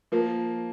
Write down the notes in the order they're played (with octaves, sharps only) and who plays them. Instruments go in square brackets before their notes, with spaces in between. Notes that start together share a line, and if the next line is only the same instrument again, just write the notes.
[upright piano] F3 A#3